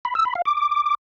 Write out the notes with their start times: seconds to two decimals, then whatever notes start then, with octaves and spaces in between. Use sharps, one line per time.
0.05 B5
0.15 E6
0.25 B5
0.35 F5
0.45 D6